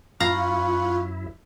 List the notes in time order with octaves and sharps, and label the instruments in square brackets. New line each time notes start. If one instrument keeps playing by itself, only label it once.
[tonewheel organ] F#2 E4 [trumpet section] C#4 F#5 B5 [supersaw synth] F4 [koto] F5 A#5